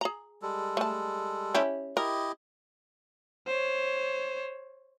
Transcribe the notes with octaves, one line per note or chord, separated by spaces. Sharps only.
G#4 A#5
G3 G#3 A4
A3 A5
C#4 E4 G4
E4 G4 A#4 D#5
C5 C#5